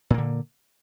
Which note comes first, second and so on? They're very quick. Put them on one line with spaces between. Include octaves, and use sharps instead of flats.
A#2 A#3 D3